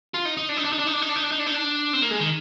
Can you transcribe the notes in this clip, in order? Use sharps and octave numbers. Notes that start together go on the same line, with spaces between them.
F4
D#4
D#4
D4
D#4
D4
D#4
D4
D#4
D4
D#4
D4
D#4
D4
D#4
D4
D#4
D4
C4
A#3
G#3
D#3